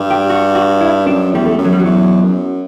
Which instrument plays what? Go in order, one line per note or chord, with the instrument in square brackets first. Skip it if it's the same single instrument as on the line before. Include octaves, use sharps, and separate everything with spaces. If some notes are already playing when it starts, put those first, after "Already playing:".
Already playing: [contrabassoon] G2
[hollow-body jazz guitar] G4
F#4
F#4
E4
[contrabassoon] F#2 [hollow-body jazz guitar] D4
[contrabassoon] E2 [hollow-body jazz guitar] G3
[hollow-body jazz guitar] A3
[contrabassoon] F#2
[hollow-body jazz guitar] F#3
G3
[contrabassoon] E2 [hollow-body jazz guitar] F#3
[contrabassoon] F#2